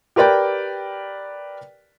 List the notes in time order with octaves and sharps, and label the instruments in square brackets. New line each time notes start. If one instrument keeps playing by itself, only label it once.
[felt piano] G4 A#4 B4 D5 G5